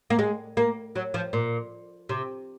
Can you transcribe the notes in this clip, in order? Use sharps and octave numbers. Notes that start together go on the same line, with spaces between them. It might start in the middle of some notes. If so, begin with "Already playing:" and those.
A#3
G#3
A#3
F#3
F3
A#2
C3